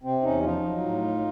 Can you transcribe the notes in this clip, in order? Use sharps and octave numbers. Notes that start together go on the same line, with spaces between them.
C3 C4
E2 C#4 D#4
F3 D#4 F4
F#3
A2